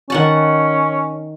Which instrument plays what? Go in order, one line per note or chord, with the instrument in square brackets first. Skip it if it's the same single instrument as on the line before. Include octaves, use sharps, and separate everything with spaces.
[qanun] D#3 F#5 A5 [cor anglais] C#4